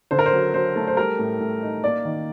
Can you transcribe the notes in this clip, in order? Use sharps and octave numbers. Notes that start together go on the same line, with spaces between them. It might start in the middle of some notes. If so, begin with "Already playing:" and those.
D3 C5
A#4
C5
F#3
F#3 C5
A3
C5
G3 A#4
A2
A2
D#4
A#3 D5
D#3